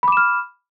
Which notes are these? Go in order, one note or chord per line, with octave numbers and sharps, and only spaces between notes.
B5 D6 F6 E7